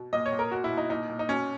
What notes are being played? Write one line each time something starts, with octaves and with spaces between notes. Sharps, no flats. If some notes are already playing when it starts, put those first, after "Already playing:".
Already playing: B2
A#2 D#5
C#5
A#2
A#4
B2 F#4
E4
B2
D#4
A#2 D#4
A#2
D#4
B2 C#4